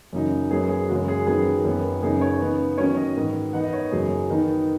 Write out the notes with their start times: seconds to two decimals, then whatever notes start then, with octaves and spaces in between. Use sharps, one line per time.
0.13 F#2 C#3 F#3 D#4
0.50 F#2 F#3 B3 G#4
0.69 G#4
0.88 F#2 C#3 G#3 C#4 F#4
1.08 G#4
1.27 F#2 D#3 F#3 B3 G#4
1.64 F#2 D#3 B3
2.02 F#2 C#3 B3 D#4 G#4
2.21 C#5
2.41 C#3 B3 D#4
2.78 D#3 F#3 C#4 C#5
2.97 D#5
3.16 G#2 D#3 B3
3.53 D#3 B3 D#4 F#5
3.64 D#5
3.73 C#5
3.92 F#2 C#3 F#3 G#4
4.30 D#3 B3 D#4